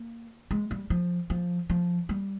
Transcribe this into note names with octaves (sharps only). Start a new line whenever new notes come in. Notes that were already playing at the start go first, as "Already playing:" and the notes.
Already playing: A#3
G#3
G3
F3
F3
F3
G3